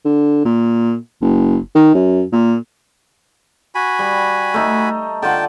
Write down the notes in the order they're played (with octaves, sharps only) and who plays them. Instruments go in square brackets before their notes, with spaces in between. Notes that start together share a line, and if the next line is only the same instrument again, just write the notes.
[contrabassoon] D3
A#2
F#1
D#3
F#2
A#2
[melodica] F#4 G#5 B5
[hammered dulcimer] G3
A3 D#4 A#5
[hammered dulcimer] D3 F4 F#5 [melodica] G5 A5